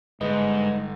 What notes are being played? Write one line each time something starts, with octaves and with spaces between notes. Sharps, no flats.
G1 G#2 G#3 B4 D#5